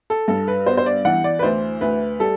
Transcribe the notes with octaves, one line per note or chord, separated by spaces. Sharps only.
A4
G2 A4
B4
B3 C5
C5
D5
E3 F#5
D5
B4
D2 C5
D2 B4
G3 A4